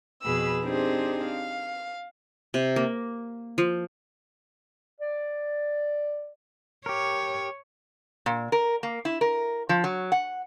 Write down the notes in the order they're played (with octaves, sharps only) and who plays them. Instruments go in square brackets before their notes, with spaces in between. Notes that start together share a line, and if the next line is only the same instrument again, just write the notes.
[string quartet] F2 B2 G#4 B4 B5 E6
C4 D4 D#4 G4 G#4 C5
F5
[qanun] C3
A#3
F3
[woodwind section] D5
[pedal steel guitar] G4 A#4 [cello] C#5
[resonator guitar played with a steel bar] A#2
A#4
A#3
E4
A#4
F3
F#3
F#5